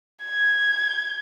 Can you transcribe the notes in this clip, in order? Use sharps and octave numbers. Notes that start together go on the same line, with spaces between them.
G#6